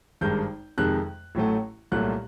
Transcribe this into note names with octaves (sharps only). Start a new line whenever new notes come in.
G#1 G2 D#3 G#3 G6
F2 C3 D#3 G#3 F#6
A1 A2 F#3 A3
C2 A#2 F#3 A3 F#6